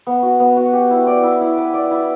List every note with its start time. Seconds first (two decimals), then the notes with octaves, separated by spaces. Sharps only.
0.07 B3
0.23 F#4
0.40 B3
0.57 F#4
0.73 G4
0.91 E4
1.07 D5
1.23 E4
1.41 E4
1.58 B4
1.74 D5
1.91 E4